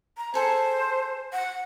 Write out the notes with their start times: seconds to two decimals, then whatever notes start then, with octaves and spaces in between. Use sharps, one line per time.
0.17 A#5
0.34 G#4 A4 C5 G#5
1.33 F#5